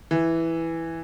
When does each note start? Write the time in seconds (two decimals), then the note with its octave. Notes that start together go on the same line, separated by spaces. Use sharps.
0.11 E3